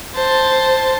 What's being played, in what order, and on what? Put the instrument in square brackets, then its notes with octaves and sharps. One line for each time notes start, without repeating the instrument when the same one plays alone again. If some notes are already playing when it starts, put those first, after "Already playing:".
[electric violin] C5 A5